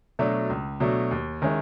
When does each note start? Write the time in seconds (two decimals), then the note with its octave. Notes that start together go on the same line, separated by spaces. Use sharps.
0.19 B2 F#3 A3 D4
0.50 C#2
0.80 B2 F#3 A3 D4
1.11 D#2
1.42 D#3 G#3 C#4 E4